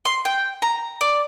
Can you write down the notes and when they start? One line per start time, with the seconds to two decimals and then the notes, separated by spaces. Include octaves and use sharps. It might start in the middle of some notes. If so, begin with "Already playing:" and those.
0.05 C6
0.25 G5
0.62 A#5
1.01 D5